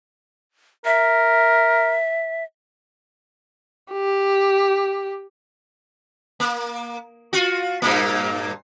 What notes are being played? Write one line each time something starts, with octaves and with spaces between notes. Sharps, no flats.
A#4 E5
G4
A#3
F4 F#4
G2 A#2 A#3